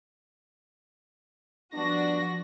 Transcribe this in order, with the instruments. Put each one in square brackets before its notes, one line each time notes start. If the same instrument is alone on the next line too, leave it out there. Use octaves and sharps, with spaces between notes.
[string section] F3 F#4 A#6 [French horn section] G3 B3 D4